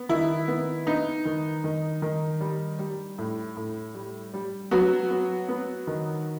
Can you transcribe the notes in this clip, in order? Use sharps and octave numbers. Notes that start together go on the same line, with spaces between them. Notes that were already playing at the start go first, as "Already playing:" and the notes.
Already playing: B3
D#3 E4
B3
B3 D#4
D#3
D#3
D#3
G3
G3
A2
A2
G3
G3
F#3 B3 F#4
B3
B3
D#3